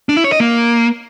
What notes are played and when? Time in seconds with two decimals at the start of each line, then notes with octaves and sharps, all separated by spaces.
0.09 D4
0.17 E4
0.24 C#5
0.32 D#5
0.40 A#3